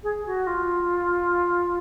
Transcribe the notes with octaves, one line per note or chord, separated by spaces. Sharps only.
G#4
F#4
F4